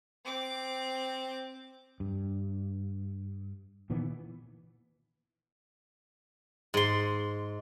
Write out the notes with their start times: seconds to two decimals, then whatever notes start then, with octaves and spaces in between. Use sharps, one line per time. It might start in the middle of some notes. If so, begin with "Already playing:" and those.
0.24 C4 D6
2.00 G2
3.90 A#2 D#3 E3 B3
6.74 G#2 C6